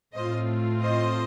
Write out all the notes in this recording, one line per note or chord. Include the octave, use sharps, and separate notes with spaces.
A2 A3 C4 F4 C5 D#5
C5 D#5